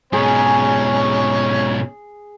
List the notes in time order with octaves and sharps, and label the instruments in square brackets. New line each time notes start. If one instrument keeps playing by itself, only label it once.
[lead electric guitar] G#2 B2 [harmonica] C#4 C#5 [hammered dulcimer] G#4